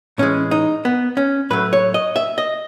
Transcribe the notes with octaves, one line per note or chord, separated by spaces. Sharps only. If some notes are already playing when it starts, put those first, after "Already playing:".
A2 E3 G#3 C#4
D#4
B3
C#4
A2 F#3 A3 B4
C#5
D#5
E5
D#5